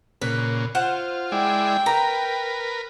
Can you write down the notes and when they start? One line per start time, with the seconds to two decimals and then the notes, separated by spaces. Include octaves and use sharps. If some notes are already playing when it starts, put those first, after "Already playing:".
0.22 A#2 C#3 B4
0.75 F4 C5 F#5
1.32 G#3 E4 D5 G5
1.86 A#4 B4 A#5